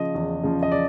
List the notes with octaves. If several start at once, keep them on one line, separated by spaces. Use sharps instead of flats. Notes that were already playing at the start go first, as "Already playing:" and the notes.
Already playing: C#3 F3 D#5
E2
C#3 F3
D#5
D5